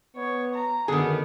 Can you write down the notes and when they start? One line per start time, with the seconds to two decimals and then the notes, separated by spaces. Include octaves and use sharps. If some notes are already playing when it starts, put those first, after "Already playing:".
0.16 B3 C#5
0.54 A#5
0.88 F#2 D3 D#3 B3 G#4